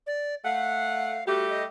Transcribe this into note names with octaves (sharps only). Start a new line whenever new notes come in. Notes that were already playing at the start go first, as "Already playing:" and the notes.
D5
A3 F5 F#5
G3 A3 F#4 G4
D#5